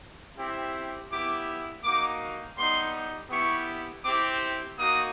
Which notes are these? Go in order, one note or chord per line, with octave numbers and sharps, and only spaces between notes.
C4 E4 G4
B3 E4 G4 D6
A#3 D#4 F#4 D6
G3 B3 D#4 C6
B3 E4 G4 C#6
C4 E4 G4 D6
A#3 D#4 F#4 D#6